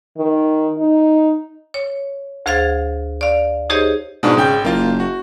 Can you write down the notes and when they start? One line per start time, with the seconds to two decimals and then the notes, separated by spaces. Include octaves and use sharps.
0.18 D#3
0.79 D#4
1.74 C#5
2.46 D2 G#4 C5 F5 G#6 A6
3.21 D5 F5
3.70 D#4 G4 G#4 C5 C#5 D#5
4.23 G#2 B2 D4 F4
4.37 G#1 C#3 G5 G6
4.65 F#1 A#3 F4
5.00 F#4